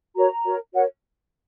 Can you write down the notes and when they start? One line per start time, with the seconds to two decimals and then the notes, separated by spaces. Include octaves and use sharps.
0.16 F#4 A#4 C#5 A#5
0.46 F#4 A#4 C#5
0.74 F#4 A#4 C#5 F#5